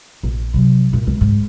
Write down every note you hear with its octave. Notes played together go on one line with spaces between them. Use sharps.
A#1
C3 F#3
G2 A#2
C#2
G#2